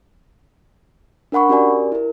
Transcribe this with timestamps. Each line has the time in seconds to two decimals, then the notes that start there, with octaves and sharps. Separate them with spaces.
1.32 D4 A#4 F#5 B5 C#6
1.49 C#4 F#4 G4 A#4 D5 G#5
1.92 E4 A#4